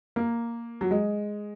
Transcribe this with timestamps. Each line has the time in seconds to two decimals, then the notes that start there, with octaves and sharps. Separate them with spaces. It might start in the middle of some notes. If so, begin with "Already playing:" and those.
0.16 A#3
0.81 F#3
0.91 G#3